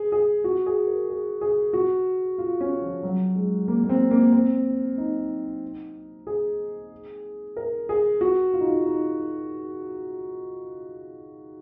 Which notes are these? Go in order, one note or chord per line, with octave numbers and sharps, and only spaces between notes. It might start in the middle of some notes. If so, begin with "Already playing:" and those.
Already playing: G#4
G#4
F#4
G#4
A#4
G#4
G#4
F#4
F4
C#4
F3
F#3
G#3
A#3
A#3
C4
A#3
C4
D#4
G#4
A#4
G#4
F#4
F4
D#4
F4
D#4